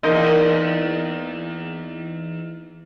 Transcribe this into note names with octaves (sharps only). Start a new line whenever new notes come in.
E2 A#3 D#4 F4 A#4 D#5